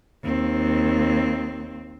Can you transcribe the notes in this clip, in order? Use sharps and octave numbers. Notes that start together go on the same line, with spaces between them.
D#2 C4